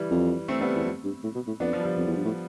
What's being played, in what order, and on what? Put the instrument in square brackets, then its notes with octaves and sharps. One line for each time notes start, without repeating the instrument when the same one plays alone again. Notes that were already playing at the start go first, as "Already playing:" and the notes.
Already playing: [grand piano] E3 G3
[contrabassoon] F2
[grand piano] A3 C4
G3 B3
[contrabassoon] E2
F2
G2
A2
B2
A2
[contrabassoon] F2 [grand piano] B3 D4
[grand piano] F3
G3
F3
[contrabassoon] F2
E2
G2
A2